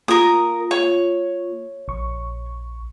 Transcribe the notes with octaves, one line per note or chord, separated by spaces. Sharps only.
A#3 F4 A#4 D#6
C#5
A#1 C#6